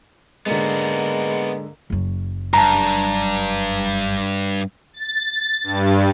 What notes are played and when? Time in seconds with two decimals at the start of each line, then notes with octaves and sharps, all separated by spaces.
0.46 G#2 D3 G#3 A#3 B3 D4
1.90 F#1 F#2
2.54 G2 A5 A#5
4.93 A6
5.64 G2